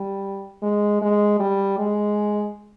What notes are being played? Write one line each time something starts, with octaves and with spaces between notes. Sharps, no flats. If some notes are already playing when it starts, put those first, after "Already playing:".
Already playing: G3
G#3
G#3
G3
G#3